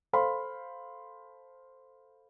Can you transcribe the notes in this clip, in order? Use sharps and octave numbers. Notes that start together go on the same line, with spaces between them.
A4 C5 F5 B5 C6